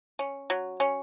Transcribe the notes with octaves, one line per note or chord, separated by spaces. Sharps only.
C#4
F#3
C#4